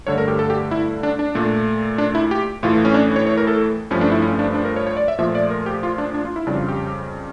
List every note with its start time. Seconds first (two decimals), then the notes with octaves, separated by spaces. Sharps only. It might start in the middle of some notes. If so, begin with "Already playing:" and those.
0.07 G2 D3 A3 C#5
0.18 A#4
0.28 G4
0.39 A4
0.50 G4
0.71 E4
1.03 D4
1.19 D4
1.35 A#2 A3
1.98 D4
2.15 E4
2.31 G4
2.63 A2 E3 A3 F4
2.85 C#4
2.94 D4
3.16 C#5
3.27 C#5
3.37 A#4
3.47 A4
3.91 G2 F3 A3 C#4
4.01 D4
4.12 E4
4.22 C#4
4.39 D4
4.55 D4
4.65 A#4
4.76 C#5
4.87 C#5
4.97 D5
5.08 E5
5.18 A#2 F3 A3 E5
5.35 D5
5.50 A#4
5.66 G4
5.83 F4
5.98 D4
6.14 D4
6.25 F4
6.36 E4
6.47 F2 C#3 G3 D4
6.57 F4
6.68 G4